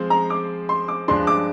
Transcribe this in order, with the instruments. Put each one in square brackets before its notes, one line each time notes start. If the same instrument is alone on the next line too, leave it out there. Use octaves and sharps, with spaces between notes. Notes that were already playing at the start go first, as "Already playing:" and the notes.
Already playing: [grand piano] F3 G#3 C4
[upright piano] A#5
D6
C6
D6
[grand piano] G2 F3 G#3 D4 [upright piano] C6
[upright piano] D6